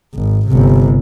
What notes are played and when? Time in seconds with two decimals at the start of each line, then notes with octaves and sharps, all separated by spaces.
0.14 G#1
0.48 G1 C3